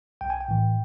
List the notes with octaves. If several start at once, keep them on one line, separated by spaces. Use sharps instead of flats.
B1 G5
G#5
G5
A2 E3